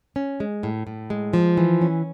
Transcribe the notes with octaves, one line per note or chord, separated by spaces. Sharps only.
C#4
G#3
A2
A2
G#3
F3
E3
C#4